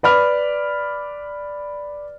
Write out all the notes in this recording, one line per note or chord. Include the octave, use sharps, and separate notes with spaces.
B4 D5 B5 F6